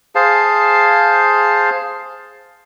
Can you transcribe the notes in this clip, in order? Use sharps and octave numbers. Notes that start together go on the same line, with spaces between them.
G#4 C5 F5 A5